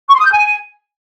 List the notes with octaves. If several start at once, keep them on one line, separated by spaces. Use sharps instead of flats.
C#6
C6
D#6
G6
G#5